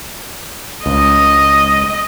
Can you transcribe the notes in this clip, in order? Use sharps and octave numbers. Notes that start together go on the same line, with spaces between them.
C#2 D#5